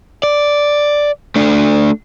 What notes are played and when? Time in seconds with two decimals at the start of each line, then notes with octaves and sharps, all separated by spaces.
0.23 D5
1.36 A3 D4